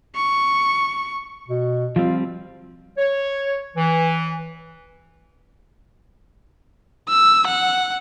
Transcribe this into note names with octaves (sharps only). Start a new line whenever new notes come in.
C#6
B2
F3 G3 C4 F4
C#5
E3
E6
F#5